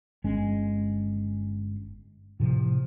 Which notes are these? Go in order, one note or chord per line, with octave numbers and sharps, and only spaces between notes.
G1 G#3 C#4
A2 C3 F3